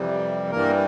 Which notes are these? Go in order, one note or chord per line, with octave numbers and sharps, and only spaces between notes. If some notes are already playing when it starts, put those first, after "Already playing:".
Already playing: F2 C3 E3 G3
G2 E3 G3 A#3 A#4